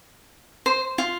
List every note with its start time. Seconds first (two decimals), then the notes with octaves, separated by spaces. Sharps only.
0.66 C5
0.98 F4